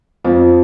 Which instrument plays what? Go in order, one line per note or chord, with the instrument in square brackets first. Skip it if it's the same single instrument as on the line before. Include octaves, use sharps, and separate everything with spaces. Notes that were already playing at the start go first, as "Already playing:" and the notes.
[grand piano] F2 F3